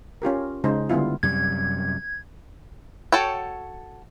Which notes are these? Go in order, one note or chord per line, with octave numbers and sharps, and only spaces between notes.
C#4 F4 G4 A#4
C#3 G#3 D#4 C5
D3 G3 B3 E4 F4
F#2 C3 G3 G#6
F#4 A4 C#5 G5